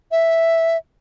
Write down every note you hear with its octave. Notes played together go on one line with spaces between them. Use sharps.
E5